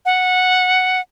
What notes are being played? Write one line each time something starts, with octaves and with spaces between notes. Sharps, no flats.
F#5